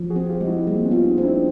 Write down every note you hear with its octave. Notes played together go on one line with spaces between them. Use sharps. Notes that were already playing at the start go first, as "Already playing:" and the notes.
Already playing: F3
F#4 G#4
C4
F4 G4
G#3
E4 F#4
G3 A#3 C4
B3 C#4
F4
C#4 D#4
C4
D4 E4